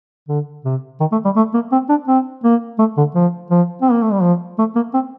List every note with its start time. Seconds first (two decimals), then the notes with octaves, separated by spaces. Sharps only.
0.28 D3
0.64 C3
1.00 D#3
1.12 A3
1.25 G3
1.36 A3
1.54 A#3
1.72 C4
1.89 D4
2.07 C4
2.44 A#3
2.79 A3
2.97 D3
3.15 F3
3.50 F3
3.82 C4
3.92 A#3
4.02 A3
4.12 G3
4.22 F3
4.58 A3
4.75 A#3
4.94 C4